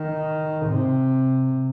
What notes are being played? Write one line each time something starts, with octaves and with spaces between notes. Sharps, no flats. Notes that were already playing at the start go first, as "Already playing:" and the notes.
Already playing: D#3
C3